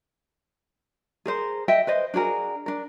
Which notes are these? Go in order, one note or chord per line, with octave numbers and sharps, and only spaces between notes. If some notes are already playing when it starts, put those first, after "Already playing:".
G#4 A#4 C5
D#5 E5 G5
B4 C5 D#5
D4 F#4 G#4 A#4
D4 A#4